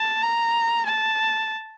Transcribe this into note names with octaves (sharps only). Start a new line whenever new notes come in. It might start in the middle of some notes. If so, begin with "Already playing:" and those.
Already playing: A5
A#5
A5